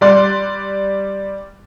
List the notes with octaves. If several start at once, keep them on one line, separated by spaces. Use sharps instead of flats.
G3 D5 C6 F#6